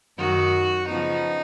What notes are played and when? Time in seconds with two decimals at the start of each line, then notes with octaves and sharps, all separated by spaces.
0.17 F#2 D#3 F#3 F#4
0.88 C#3 F3 B3 D#4